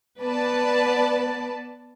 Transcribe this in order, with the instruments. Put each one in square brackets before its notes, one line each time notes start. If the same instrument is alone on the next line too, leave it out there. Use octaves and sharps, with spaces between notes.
[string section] B3 B4 D5 A5